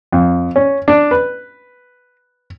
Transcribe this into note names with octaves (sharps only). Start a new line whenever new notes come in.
F2
C#4
D4
B4